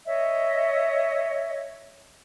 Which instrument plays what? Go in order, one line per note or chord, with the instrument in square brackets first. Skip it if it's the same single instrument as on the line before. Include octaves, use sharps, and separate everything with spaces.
[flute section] C#5 D#5 E5